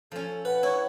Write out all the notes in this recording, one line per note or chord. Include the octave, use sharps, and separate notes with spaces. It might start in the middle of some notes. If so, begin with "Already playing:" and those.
F3 C#4 A4
B4 F#5
E4 C#5